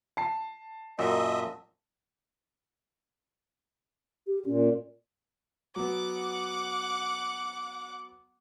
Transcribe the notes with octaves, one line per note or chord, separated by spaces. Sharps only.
A5 C7
F#2 A#2 D#5 E5
G4
A#2 C#4
F#3 B3 F#5 D6